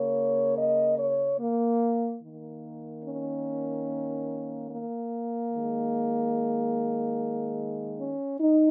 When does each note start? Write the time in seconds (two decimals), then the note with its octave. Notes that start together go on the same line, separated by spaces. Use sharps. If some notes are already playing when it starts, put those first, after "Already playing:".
Already playing: C#3 A#3 C#5
0.58 D#5
0.99 C#5
1.40 A#3
2.22 D#3 A#3
3.04 C#4
4.69 A#3
5.52 D#3 G#3
7.99 C#4
8.40 D#4